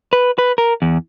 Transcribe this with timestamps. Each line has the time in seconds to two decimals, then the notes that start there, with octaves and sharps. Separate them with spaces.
0.13 B4
0.38 B4
0.58 A#4
0.82 E2